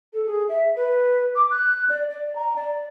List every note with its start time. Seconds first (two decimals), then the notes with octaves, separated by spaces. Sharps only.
0.13 A4
0.26 G#4
0.49 E5
0.76 B4
1.36 D6
1.51 F#6
1.90 D5
2.10 D5
2.36 A#5
2.56 D5